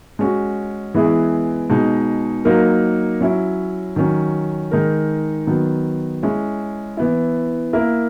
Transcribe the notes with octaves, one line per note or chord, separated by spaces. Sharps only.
G#3 C#4 F#4
E3 G#3 B3 E4 G#4
B2 G#3 D#4
F#3 A#3 D#4 A#4
F#3 C#4 E4
D#3 F#3 C#4
D#3 G#3 D#4 A#4
D#3 F#3 B3
G#3 C#4 E4
E3 B3 E4
A#3 E4 A#4